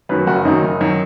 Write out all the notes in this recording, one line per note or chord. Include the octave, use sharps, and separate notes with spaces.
F#2 D#3 F#3 B4
F#1 F#4
F#2 D#3 F#3 D#4
F#1
F#2 D#3 F#3